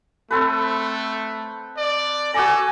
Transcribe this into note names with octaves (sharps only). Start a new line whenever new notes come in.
A3 C4 A4 B4
D5
F#4 A4 D5 G#5 A#5